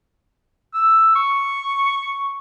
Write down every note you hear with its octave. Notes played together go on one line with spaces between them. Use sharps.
E6
C#6